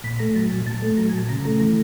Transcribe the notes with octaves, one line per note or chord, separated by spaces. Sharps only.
A#2 B5
A3 A#5
F#3 A5
A#2 G#5
A#2 A5
A3
F#3 A#5
G#5
A#2 A5
C#3 A#5
A3 A#5
E3 A#5